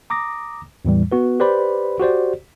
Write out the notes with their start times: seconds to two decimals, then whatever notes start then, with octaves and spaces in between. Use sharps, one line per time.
0.10 A#5 D6 D#6 A#6
0.85 E2 A2 E3 G3
1.12 B3 F#4 B4
1.40 G4 B4 C5 D5 B5
2.00 F#4 G4 C5 D5